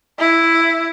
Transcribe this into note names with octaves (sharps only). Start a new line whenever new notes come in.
E4